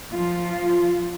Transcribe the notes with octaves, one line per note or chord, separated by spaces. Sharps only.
F3 F4